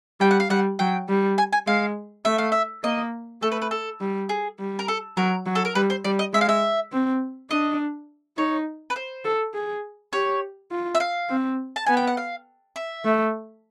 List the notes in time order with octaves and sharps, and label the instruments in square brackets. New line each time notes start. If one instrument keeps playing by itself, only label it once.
[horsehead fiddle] G3 [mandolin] G5
[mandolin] F#5
F5
[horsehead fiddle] G3 [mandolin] F#5
[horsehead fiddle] F#3 [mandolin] G5
[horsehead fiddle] G3
[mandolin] G#5
G#5
[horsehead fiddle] G#3 [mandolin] F5
[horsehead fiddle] A3 [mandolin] E5
[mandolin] F5
E5
[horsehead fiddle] A#3 [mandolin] D#5
[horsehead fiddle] A3 [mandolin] A4
[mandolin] B4
B4
A4
[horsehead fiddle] G3
[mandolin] G#4
[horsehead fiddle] G3
[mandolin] A#4
A4
[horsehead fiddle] F#3 [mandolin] A#4
[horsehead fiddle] F#3
[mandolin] A4
A#4
[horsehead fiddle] G3 [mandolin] B4
[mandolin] C5
[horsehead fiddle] G3 [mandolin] D5
[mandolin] D#5
[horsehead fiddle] G#3 [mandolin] E5
[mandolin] F5
E5
[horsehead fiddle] C4
[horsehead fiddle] D4 [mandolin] D#5
[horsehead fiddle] D#4 [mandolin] C#5
[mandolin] B4
C5
[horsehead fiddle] A4
G#4
[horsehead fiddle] G4 [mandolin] C#5
[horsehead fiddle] F4
[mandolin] E5
F5
[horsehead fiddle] C4
[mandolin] A5
[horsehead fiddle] B3 [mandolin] G#5
[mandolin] G5
F#5
F5
E5
[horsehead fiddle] A3